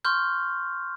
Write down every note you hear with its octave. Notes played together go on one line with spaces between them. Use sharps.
C6 C#6 F6 G6